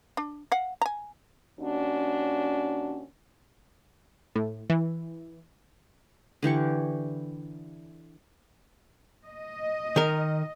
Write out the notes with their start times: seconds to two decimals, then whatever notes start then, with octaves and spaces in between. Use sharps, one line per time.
0.17 D4
0.52 F5 F#5
0.82 G#5 A#5
1.59 D#2 C#4 D4 F#4
4.35 A2
4.70 E3
6.43 D3 E3 G4 C#6
9.27 D#5
9.96 D#3 A#4